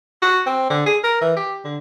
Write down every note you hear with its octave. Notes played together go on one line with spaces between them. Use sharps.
F#4
C4
D3
G#4
A#4
E3
G4
D3